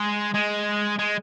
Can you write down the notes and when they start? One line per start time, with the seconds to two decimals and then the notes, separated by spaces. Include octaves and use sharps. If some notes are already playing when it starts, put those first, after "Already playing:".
Already playing: G#3
0.34 G#3
0.99 G#3